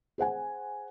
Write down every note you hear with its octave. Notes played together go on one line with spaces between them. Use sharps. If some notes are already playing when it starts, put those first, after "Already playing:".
G#4 C5 F#5 G#5